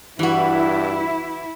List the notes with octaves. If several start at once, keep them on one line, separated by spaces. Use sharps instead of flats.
G2 E3 E4 F#4